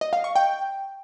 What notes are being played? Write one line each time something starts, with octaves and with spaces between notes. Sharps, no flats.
D#5
F5
C#6
G5